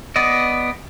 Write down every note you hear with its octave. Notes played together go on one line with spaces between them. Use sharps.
B3 D5 D#5